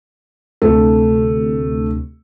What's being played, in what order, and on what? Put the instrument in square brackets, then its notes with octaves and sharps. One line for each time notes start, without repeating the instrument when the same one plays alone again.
[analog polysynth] D2 C3 [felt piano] A3